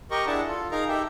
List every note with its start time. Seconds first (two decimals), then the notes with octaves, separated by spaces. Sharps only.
0.11 G4 A#4 D#5 C#6
0.27 D4 E4 G#4 F#5 A5
0.48 F4 A4
0.71 D#4 G#4 A#4 F5 A#5
0.88 D#4 G4 A4 E5 G5